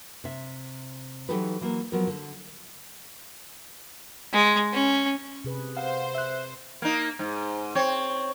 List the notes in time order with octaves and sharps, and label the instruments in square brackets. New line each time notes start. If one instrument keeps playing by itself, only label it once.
[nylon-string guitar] C3 E5
E3 F#3 D#4 G4 A4 B4
E3 F#3 A#3
F3 F#3 B3 A#4
D3
[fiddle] G#3
C#4
[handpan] C3 G#4 B4
[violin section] C5 [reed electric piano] F5 F#5
[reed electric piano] E5 F#6
[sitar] A#3 D#4
G#2
C4 C#5